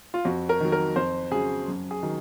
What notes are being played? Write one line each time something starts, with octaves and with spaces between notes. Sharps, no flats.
F4
F2 F#4
A#4
D#3 F#3
A#4
F2 C5
C#3 F#3 G#4
F#2
G#4
D#3 F#3